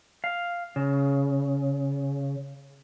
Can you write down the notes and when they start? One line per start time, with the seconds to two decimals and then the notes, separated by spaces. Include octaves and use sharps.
0.24 F5
0.76 C#3